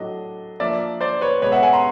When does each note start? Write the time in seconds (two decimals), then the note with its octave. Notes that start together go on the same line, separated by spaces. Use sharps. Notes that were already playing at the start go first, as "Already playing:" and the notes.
Already playing: A2 F#3 A3 D4 D#5
0.60 F3 A#3 D4 D5 E5
1.01 C5 D5
1.21 B4 C#5
1.42 B2 G#3 B3 D4 B4 C#5
1.52 E5 F#5
1.63 F#5 G#5
1.73 A#5 C6